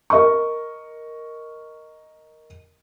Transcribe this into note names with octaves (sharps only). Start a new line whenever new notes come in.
A#4 D#5 C#6